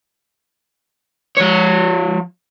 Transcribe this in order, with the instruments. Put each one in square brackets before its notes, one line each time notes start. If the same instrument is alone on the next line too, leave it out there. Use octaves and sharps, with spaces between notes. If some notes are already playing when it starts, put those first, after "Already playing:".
[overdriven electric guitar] F3 C#5